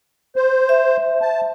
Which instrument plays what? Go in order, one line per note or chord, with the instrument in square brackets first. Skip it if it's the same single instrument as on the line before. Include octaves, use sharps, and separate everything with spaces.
[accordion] C5
[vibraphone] E5
[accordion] A5